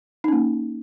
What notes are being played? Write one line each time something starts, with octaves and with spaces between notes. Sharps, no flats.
A#3 C#4 D#4